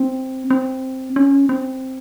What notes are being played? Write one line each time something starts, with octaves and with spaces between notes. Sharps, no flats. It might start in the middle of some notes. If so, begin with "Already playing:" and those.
Already playing: C4
C4
C#4
C4